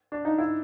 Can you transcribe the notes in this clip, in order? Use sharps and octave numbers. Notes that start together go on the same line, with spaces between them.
D4
D#4
E4